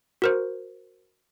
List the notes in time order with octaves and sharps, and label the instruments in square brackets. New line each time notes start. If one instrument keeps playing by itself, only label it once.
[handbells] F#4 A#4 C5